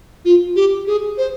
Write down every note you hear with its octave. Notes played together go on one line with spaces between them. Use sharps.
F4
G4
G#4
C5